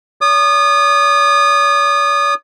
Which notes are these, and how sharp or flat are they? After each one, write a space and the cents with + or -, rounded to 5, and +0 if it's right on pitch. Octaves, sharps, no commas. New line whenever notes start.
C#5 +45 D#6 -30